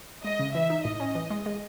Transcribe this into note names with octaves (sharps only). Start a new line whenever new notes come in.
G#3 D#5
C#3
E3 E5
D#4
A2 D#5
C#4
E3
G#3
G#3